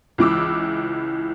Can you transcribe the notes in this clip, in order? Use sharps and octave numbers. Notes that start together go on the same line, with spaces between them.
C#2 E3 D6 E6